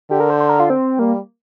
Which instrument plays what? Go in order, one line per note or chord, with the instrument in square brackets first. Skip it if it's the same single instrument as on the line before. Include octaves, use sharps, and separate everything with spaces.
[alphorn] D3 [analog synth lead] G4
[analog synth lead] A#4
C5
C5
A#4
F4
C4
[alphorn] G3 [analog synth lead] A#3